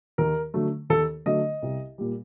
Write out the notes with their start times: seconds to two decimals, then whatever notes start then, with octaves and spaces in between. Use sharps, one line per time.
0.18 D#2 A#4
0.54 D3 F#3 A3
0.90 D#2 A4
1.26 D3 F#3 A3 D#5
1.62 C2
1.98 A#2 G3